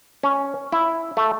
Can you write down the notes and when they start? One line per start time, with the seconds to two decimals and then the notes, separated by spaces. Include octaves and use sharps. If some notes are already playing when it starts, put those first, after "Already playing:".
0.23 C#4
0.72 E4
1.17 A3